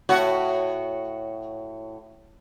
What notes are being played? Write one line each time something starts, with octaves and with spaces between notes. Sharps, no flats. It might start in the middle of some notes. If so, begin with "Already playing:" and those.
A2 F#4